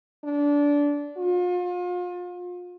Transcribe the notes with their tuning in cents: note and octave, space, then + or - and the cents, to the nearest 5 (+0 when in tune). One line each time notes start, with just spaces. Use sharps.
D4 -20
F4 +35